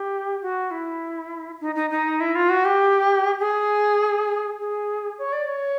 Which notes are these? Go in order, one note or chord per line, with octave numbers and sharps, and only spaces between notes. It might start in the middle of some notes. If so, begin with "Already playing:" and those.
Already playing: G4
F#4
E4
D#4
D#4
D#4
E4
F4
F#4
G4
G#4
G#4
C#5
D5
C#5